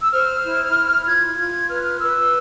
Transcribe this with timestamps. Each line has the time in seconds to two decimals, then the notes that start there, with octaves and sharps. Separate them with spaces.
0.02 E6
0.11 C5 F6
0.43 E4
0.75 E4
1.06 F4 G#6
1.38 F4 G#6
1.69 B4 F6
2.00 B4 E6